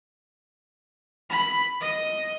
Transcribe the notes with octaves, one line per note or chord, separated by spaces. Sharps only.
B5
D#5